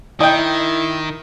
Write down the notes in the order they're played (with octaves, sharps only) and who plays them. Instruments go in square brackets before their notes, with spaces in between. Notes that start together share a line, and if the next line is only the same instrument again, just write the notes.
[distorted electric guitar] D#3 [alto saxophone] E4 [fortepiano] D#5 G5